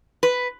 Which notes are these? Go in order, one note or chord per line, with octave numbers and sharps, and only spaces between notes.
B4